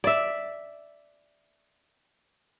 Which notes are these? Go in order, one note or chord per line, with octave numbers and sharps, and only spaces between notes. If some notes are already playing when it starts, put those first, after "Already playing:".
D5 E5